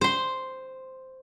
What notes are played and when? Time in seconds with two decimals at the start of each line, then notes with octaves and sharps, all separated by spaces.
0.01 C5 C6